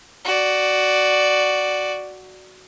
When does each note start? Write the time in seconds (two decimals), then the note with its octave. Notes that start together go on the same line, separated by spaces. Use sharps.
0.25 F#4 D5